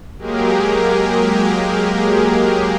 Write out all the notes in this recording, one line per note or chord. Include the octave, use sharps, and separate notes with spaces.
F#3 G#3 A#3 G4 G#4 A#4